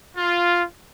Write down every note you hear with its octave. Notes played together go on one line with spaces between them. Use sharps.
F4